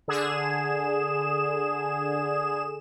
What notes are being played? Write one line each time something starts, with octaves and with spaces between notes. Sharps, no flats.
D3 G#4 E7